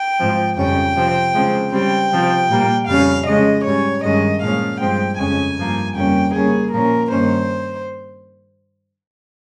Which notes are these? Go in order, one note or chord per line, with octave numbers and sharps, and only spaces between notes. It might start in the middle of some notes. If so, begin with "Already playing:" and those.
Already playing: G5
G#2 F3 C4
F2 C#3 G3 C#4 G5
C3 F3 C4
C#3 F3 G#3 C4
C#3 G3 C4 G5
C3 F3 C4
A#2 G3 A#3
F2 C#3 G3 C#4 F5
C#3 F3 G#3 C#4 D#5
G#2 G3 C#4 C#5
G2 D#3 G#3 C#4 D#5
A#2 F3 G#3 C#4 F5
G2 F3 G#3 C4 G5
F2 C#3 G#3 C#4 G#5
G2 F3 A#3
F2 C#3 G3 A#3 C#4 G5
C#3 G3 A#3 C#4 G#4
A#2 F3 A#3 C#4 A#4
G2 D#3 A#3 C#4 C5